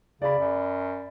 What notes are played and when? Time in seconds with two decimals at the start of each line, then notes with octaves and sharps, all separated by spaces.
0.22 C#3 D5 B5
0.39 F#2